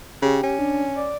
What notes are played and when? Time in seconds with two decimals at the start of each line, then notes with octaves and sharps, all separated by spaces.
0.22 C#3 G4
0.43 C#4
0.59 D4
0.96 D5